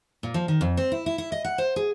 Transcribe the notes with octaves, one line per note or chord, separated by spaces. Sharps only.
A#2
F3
D#3
F2
C4
E4
E4
E4
D#5
F#5
C5
G#4